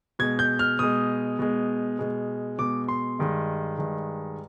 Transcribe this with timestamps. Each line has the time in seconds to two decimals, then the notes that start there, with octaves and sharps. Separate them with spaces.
0.19 B2 G#3 G#6
0.39 G6
0.59 F6
0.79 B2 G#3 D#6
1.39 B2 G#3
1.99 B2 G#3
2.59 B2 G#3 D6
2.88 C6
3.19 G2 D#3 G#3
3.78 G2 D#3 G#3